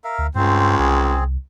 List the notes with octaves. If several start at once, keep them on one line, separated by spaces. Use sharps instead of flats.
A#4 E5 F5
D2
C#2 G2 C4 C5
C2 C4 G#4